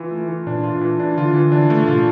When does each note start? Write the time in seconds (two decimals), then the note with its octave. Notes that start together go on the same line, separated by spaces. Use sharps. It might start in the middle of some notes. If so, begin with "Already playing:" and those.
Already playing: E3 F4
0.11 A3
0.28 E3
0.46 A#2 D4
0.63 F4
0.81 E3
1.00 D4
1.17 D3 F4
1.35 E3
1.52 D4
1.70 A3
1.83 C3
1.87 A#2 F4